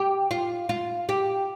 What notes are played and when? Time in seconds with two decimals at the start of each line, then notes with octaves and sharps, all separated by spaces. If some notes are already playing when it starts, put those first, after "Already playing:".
Already playing: G4
0.31 F4
0.69 F4
1.09 G4